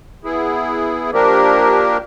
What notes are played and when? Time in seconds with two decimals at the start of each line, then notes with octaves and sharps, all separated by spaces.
0.24 B3 E4 G#4
1.11 F3 A#3 D4 G4 A#4